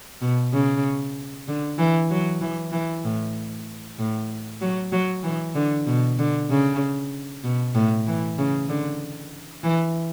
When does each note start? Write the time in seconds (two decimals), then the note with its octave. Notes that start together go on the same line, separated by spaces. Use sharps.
0.22 B2
0.53 C#3
1.48 D3
1.78 E3
2.10 F#3
2.41 E3
2.72 E3
3.05 A2
3.99 A2
4.61 F#3
4.92 F#3
5.23 E3
5.55 D3
5.87 B2
6.19 D3
6.50 C#3
7.44 B2
7.75 A2
8.07 E3
8.39 C#3
8.69 D3
9.64 E3